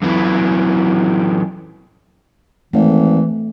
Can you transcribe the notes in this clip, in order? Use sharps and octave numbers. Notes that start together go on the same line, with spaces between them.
F#2 E3
G#1 E3 A3